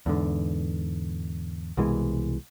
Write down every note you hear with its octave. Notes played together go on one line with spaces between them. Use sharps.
E2 G#2 D3
C2 B2 E3 G#3